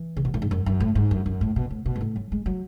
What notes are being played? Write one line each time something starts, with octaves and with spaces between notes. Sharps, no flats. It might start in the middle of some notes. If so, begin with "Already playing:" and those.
Already playing: E3
C#3
B2
A2
G#2
F#2
F#2
A2
G#2
F#2
F#2
A2
B2
A2
B2
G#2
A2
F#3
G#3
F#3